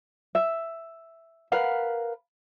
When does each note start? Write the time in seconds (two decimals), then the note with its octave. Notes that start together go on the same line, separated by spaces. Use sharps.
0.35 E5
1.52 A#4 B4 F5 F#5